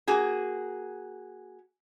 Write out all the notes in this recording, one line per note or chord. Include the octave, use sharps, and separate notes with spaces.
A#3 F#4 G#4